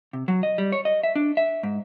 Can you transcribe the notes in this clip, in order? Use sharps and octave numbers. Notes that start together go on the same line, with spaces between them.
C3
F#3
D#5
G3
C#5
D#5
E5
D4
E5
G#2